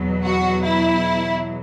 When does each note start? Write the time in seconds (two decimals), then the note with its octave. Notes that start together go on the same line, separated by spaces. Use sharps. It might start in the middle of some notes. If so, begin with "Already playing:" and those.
Already playing: E2 B2 F#3
0.25 F#4
0.64 E4